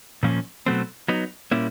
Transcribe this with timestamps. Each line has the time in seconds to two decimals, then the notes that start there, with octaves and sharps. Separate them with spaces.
0.23 A#2 F3 A#3 C#4
0.66 B2 F#3 A3 C4
1.08 F#3 B3 D#4
1.51 A#2 G3 A#3 C#4 E4